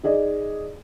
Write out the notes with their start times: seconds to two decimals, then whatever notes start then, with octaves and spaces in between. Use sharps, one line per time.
0.03 D#4 G#4 D5 D#5